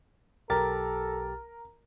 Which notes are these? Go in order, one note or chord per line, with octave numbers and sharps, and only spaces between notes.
B1 G4 A4 A#4 A6